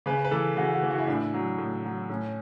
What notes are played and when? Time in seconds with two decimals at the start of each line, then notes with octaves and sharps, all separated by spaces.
0.06 C#3 B4
0.24 B4
0.31 E3 A4
0.56 C#3 F#4
0.74 F#4
0.83 E3
0.91 F#4
0.98 E4
1.07 A2 D4
1.14 E4
1.34 F#3
1.58 A2
1.85 F#3
2.09 A2 C#4